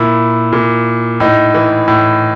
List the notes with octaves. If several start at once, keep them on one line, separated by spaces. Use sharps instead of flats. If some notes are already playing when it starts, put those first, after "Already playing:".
Already playing: A#2 E4
A#2
A2 D#4
E3
A2